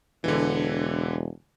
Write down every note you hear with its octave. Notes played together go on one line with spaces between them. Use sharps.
E1 D3 E3